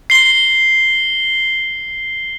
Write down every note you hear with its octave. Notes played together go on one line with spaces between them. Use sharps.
C7 G7